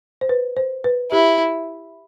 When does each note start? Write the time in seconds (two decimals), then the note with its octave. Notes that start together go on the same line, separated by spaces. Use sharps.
0.21 C5
0.29 B4
0.57 C5
0.84 B4
1.11 E4 G4